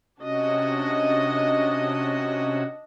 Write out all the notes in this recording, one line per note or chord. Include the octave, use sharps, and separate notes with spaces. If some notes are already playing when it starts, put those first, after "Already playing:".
C3 C#4 D4 F#4 D#5